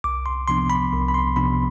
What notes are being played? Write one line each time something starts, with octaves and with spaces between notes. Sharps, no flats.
C2 D6
C6
C3 F3 B3 D4 C6
B5
C2
B5
C6
C3 F3 B3 D4 B5